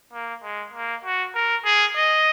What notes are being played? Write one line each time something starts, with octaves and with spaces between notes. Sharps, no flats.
A#3
G#3
A#3
F#4
A#4
G#4
D#5